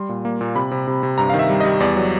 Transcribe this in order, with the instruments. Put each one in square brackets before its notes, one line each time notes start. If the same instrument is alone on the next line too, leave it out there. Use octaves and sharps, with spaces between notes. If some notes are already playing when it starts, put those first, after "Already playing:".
Already playing: [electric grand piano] G3 C6
A#2
A#3
A#2
C3 B5
C3
C3
C3
G2 A#5
D#3 F5
E5
G3
G3 D#5
E2 D5
F#3